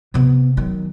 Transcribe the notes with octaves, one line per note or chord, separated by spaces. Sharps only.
C3 B3
D#3 F#3